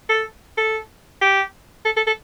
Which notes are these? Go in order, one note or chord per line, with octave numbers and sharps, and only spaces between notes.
A4
A4
G4
A4
A4
A4